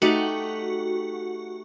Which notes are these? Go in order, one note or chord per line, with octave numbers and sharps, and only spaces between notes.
A3 D#4 F#4 G4